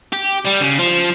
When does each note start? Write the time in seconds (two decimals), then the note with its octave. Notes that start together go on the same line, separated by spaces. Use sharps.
0.13 G4
0.46 G3
0.62 C#3
0.79 F3